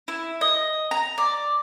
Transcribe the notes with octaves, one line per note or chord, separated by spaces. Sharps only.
E4
D#5
A#5
D5